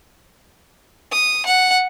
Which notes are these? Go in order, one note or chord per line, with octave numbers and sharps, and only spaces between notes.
D#6
F#5